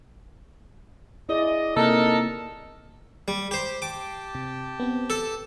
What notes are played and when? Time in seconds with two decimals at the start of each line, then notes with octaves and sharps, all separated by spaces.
1.29 E4 G#4 D5 D#5
1.76 C3 A#3 D#4 A4 A#4
3.28 G3
3.51 G4 C5
3.82 G4 G5 A5 D6
4.35 C3
4.80 B3 C4
5.10 A4 E6